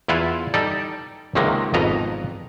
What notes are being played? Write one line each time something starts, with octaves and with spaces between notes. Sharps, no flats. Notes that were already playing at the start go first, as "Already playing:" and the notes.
E2 E4 F4 F#5 G#5
G3 D#4 A4 D5 A5
C#2 C3 D#3 F#3 G#3 A#3
G#1 F2 B2 B3 D#5 A#5